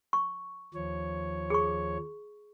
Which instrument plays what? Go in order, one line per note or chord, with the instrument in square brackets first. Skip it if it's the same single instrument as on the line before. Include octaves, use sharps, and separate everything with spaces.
[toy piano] C#6
[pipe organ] D#2 F3 C#5
[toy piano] G#4 C#6